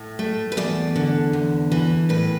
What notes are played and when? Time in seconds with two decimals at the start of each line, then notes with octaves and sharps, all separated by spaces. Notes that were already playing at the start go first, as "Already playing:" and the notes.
Already playing: A2
0.19 A3
0.52 B4
0.57 E2 D5
0.96 D3
1.33 E2
1.72 E3
2.09 A2 B4